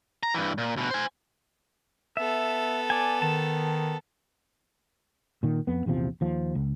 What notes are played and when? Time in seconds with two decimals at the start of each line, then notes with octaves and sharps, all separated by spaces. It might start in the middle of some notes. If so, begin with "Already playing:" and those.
0.23 A#5
0.34 G2 E3
0.58 A#2
0.76 D2 B2
0.90 C5 G#5
2.17 B3 A4 E5
2.90 D5 G#5
3.22 D#3 A5
5.43 A#2 D#3
5.67 F2 B3
5.86 A#1 E2 C3 F3
6.21 D#2 F3
6.55 C#2